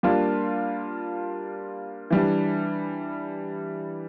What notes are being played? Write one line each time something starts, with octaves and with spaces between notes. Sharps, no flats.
G3 A#3 D4 F4
E3 G3 D4